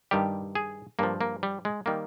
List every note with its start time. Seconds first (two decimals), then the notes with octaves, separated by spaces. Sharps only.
0.11 G2 D#3 G3 G4
0.55 G#4
0.99 G2 F3 A#3
1.21 A#3
1.43 G3
1.65 G#3
1.86 D#3 G3 A#3